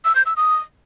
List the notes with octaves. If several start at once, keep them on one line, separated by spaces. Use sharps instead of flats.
E6
G6
E6
D#6